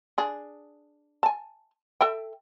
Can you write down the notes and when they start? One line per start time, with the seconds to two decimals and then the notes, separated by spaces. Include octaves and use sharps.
0.18 D4 G#4
1.23 G#5 A5
2.01 A4 E5 G5